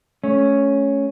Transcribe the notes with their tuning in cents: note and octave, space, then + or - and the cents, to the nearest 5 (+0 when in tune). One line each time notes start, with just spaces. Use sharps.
A3 -20 C#4 +0